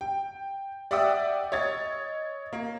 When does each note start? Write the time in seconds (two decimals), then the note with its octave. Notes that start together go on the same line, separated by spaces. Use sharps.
0.01 G5
0.91 D5 E5 F#5 G5 D#6 E6
1.52 C#5 D#5 G#6 A6
2.53 A#3